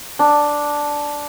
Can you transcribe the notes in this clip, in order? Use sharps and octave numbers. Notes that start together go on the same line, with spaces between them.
D4